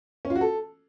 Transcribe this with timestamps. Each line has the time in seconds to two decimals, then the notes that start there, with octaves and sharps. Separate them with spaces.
0.25 C#4
0.30 F4
0.36 F#4
0.41 A4